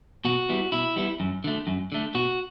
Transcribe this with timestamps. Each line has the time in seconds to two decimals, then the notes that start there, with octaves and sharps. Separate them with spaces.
0.25 B2 F#4
0.49 G3 B3 E4
0.72 B2 E4
0.96 G3 B3 E4
1.20 F#2
1.44 D3 A3
1.67 F#2
1.92 D3 A3
2.15 B2 F#4